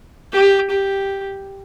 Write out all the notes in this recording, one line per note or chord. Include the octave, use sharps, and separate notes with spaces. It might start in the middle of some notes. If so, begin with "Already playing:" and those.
G4
G4